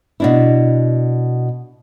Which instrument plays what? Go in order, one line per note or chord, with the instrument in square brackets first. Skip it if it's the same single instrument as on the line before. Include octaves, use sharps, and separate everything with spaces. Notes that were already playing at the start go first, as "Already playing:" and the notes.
[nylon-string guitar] B2 D4 E4